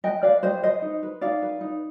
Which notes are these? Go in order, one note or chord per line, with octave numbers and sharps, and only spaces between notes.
B4 D#5 G5
B4 D5 F5
G4 C5 D#5
B4 C5 D#5
D#4
B4
D#4 D5 F5
B4
D#4